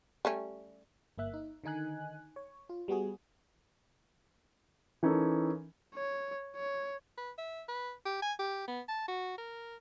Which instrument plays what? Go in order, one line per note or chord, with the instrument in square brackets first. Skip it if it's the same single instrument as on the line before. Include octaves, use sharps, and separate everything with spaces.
[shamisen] G3 A3 C#4
[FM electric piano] G1 A#3 E5 F#6
D#4
D3 D#3 D#4 G#5 F#6
C#5
F4
G3 B3 F#4 G#4
[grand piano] E3 C#4 D#4 A4 A#4
[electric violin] C#5
C#5
[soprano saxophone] B4
E5
B4
G4
G#5
G4
B3
A5
F#4
A#4